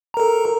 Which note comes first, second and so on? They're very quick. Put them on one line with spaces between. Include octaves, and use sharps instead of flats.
A#5 A#4 A4